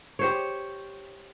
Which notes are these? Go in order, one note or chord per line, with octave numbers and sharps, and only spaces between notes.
G4 C5 C#5